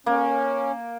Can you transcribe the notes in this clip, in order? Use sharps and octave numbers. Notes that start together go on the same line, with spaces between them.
A#3 C#4